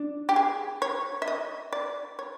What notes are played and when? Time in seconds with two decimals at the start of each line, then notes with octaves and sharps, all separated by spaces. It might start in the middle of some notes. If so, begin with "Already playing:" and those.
Already playing: D4
0.29 G4
0.36 G#4
0.82 C#5
1.22 E5
1.28 D#5
1.73 D5
2.19 C#5